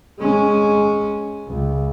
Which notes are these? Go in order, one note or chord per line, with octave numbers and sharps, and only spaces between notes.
G#3 C#4
C#2